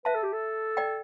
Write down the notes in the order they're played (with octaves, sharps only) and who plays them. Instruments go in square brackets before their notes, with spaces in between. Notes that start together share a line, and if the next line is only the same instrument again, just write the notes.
[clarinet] B4 [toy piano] E5 A5
[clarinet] A4
G4
A4
[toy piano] D5 G5